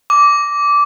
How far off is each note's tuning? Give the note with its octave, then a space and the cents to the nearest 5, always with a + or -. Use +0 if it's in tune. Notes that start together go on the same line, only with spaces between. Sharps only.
D6 -15